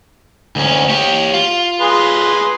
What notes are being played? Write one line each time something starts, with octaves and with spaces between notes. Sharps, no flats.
D2 C#4
G4 C#5
F4
G#4 B4 C6